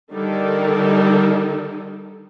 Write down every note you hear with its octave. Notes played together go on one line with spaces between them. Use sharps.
D3 D#3 G3 D#4 A4 A#4